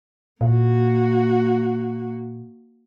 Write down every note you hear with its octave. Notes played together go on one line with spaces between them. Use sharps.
A#2 A#3 F#4